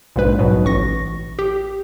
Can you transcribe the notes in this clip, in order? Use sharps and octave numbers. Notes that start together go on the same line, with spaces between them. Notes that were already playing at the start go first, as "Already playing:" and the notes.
A#1 G#2 B2 G#3 B4
C2 G#2 B2 F#3
A1 C#6 A#6
G4